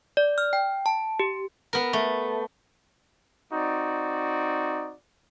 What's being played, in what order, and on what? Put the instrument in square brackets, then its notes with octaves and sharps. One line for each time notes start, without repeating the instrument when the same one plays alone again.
[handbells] D5
F6
G5
A5
G4
[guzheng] B3 A#4
A3
[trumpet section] C4 D#4 F#4 D5